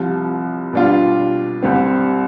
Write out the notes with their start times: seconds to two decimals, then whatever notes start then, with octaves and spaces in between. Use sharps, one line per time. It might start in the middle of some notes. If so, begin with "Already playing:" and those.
Already playing: C2 C3 F3
0.73 B2 G3 D4 F4
1.62 C2 C3 G3 C4